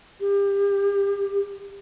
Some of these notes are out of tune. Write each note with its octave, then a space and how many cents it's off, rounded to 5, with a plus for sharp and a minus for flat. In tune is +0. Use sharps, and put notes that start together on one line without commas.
G4 +30